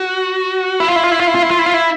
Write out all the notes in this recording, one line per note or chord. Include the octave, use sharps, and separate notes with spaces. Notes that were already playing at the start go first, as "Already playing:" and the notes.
Already playing: F#4
E4
F4
E4
F4
E4
F4
E4
F4
E4
F4
E4
F4
E4